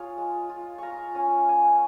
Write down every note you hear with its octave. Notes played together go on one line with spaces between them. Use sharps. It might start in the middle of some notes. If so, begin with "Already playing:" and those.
Already playing: F4 G#4 C#5 F5
G#3
F4
F4 F5 A#5 C#6
C#4 G#5 C#6
A#3 G#5 C#6
C#6